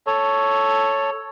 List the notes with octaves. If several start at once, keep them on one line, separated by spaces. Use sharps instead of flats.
A4 C#5